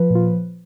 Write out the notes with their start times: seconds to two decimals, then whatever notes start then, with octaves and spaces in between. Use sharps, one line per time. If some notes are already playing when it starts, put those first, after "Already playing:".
Already playing: F3 B4
0.10 A#2 F4